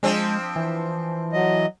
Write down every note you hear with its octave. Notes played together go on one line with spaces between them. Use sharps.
F3 G#3 C4 D4
E3
F#3 D#5